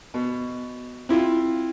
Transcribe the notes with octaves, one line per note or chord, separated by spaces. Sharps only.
B2
C4 E4 F4